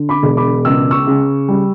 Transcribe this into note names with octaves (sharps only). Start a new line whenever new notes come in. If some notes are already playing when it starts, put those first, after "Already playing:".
Already playing: D3
B5 D6
E1
B5 D6
C#2 E6
C#6 E6
C#3
G3